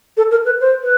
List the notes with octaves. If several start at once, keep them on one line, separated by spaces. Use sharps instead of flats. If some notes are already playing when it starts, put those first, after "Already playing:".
A4
A#4
B4
C5
B4